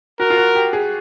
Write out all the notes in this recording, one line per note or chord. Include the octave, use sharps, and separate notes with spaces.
F#4 A#4
F4
F#4
G4
G#4